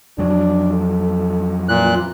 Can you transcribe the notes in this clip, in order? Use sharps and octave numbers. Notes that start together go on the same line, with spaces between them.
F2 F3 F#3 D4
A4
A#2 E3 F#6